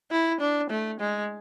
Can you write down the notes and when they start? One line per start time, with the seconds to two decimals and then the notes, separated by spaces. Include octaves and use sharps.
0.11 E4
0.40 D4
0.70 A3
1.00 G#3